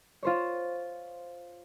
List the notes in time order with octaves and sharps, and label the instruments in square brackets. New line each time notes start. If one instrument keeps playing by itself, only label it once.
[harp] F4 C5 C#5